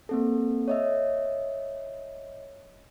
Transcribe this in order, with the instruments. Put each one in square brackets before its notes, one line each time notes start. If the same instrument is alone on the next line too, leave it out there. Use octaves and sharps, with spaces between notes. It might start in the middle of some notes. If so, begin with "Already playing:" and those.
[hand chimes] A#3 C4 A4
C#5 D#5 E5